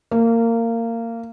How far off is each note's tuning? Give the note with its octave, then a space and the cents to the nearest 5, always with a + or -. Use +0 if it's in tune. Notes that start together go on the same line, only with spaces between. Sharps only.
A#3 -20